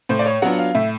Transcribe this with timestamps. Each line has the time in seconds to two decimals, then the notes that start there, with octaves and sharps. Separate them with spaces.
0.09 A2 C5
0.19 D5
0.26 C#5
0.42 F#3 B3 D4 F4 F#5
0.59 F5
0.75 A2 E5